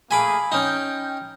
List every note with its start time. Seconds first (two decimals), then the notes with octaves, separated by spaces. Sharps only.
0.11 A3 A#3 G#4 G#5 B5 D6
0.52 C#4 D#4 G5